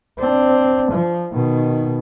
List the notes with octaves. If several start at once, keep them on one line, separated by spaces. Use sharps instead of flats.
C4 D4
F3
B2 D#3